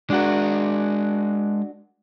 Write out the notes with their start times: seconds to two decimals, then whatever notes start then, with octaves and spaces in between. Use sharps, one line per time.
0.10 G#3 D4 F#4 A#4